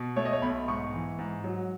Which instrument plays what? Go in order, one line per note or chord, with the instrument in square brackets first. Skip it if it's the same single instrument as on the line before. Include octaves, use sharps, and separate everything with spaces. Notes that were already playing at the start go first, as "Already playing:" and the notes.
Already playing: [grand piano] B2
A3 C#5
D#5
C#5
B1 B5
G#2 C#6
E3
G#2
F#3